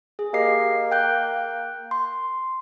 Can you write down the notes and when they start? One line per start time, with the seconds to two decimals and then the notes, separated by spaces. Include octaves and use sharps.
0.19 G#4
0.34 A#3 G4 D#5 C7
0.91 G5 F#6 G6
1.91 C6